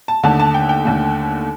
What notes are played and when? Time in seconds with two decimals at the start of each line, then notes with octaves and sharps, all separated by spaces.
0.08 A5
0.23 D#2 D3 A3 A5
0.40 A5
0.54 G5
0.69 G5
0.85 D#2 D3 A3